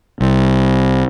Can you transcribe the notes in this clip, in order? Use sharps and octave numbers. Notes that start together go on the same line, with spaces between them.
C2